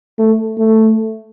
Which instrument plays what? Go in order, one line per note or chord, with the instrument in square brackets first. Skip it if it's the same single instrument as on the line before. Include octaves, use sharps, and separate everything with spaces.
[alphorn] A3
A3